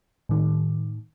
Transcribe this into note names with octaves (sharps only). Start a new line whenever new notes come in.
A2 D#3